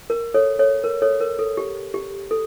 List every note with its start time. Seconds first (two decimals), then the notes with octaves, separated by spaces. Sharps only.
0.10 A#4
0.34 A4 C#5
0.59 A4 C#5
0.84 A#4
1.02 A4 C#5
1.21 A#4
1.39 A4
1.57 G4
1.94 G4
2.31 A4